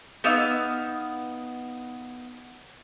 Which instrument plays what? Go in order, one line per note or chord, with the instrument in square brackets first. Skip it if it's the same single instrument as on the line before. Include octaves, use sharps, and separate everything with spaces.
[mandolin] B3 D#4 F5 E6